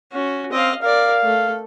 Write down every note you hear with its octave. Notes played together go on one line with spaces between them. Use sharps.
C#4 F#4
C4 D#5 F5
A#4 D5 F5
A3 A4